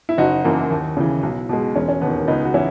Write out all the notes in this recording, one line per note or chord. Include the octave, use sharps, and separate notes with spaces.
E4
F#1 D#4 F#4
F#2 E3 A#3
D#2
C#3 E3
B1
B2 G#3
E1 C#4
C#4
D#2 D#3 B3
C#2 B3 D#4
F#4
E3 C#4 E4